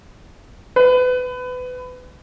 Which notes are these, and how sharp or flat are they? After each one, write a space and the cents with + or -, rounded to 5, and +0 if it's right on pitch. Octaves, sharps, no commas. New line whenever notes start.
B4 +25